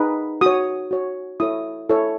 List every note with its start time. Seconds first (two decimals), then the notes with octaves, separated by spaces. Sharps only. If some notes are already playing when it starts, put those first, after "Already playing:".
Already playing: D#4 G#4 B4
0.41 F#4 C#5 D#6
0.91 F#4 C#5
1.40 E4 A4 C#5 D#6
1.90 E4 A4 C#5